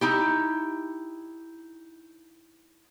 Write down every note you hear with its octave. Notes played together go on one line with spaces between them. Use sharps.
D#4 E4 G4